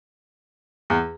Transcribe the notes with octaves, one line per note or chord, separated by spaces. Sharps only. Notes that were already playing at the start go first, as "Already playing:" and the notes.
E2